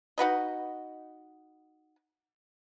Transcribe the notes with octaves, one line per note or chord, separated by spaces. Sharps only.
D#4 F#4 B4 D#5